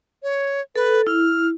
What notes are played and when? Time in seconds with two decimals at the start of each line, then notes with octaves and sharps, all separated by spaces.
0.23 C#5
0.76 A4 B4
1.07 E4 F6